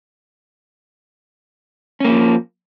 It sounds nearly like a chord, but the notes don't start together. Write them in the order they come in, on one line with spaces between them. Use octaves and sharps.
C#4 A#3 F3